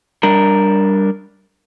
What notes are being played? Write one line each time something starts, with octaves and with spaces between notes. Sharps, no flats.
G3 D4 A#4